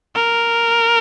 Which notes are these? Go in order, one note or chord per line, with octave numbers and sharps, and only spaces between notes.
A#4